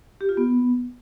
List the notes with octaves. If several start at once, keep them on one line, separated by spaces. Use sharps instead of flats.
G4
F4
B3